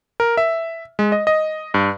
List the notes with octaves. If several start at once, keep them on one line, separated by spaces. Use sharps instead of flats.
A#4
E5
G#3
D#5
D#5
G2